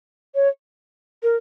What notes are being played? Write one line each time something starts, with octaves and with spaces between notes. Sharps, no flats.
C#5
A#4